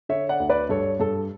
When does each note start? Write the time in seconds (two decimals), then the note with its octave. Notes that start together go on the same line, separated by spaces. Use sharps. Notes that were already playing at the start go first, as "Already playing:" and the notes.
0.09 D3 C#5 E5
0.29 D5 F#5
0.40 D2
0.49 B4 D5
0.69 G2 A4 C#5
1.00 G2 A4